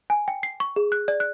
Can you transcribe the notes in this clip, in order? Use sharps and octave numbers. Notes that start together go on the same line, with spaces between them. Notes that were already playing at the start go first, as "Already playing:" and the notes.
G#5
G5
C7
C#6
G#4
F#6
D5
F#6